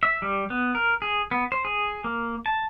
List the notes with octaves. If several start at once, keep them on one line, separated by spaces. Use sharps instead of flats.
E5
G3
B3
A#4
G#4
B3
C5
G#4
A#3
A5